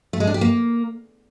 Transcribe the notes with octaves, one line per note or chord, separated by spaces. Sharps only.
A3
G#3
D4
G4
A#3